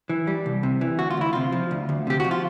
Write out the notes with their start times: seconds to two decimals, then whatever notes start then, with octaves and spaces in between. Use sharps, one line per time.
0.10 E3
0.27 G3
0.46 C2
0.63 C3
0.81 E3
0.99 D2 F#4
1.11 F4
1.17 D2 E4
1.33 C3 F4
1.52 F3
1.71 D2
1.89 D2
2.07 C3 G4
2.20 F3 F#4
2.31 F4